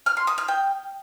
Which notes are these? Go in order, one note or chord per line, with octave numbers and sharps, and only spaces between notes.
F6
C6
D#6
F6
G5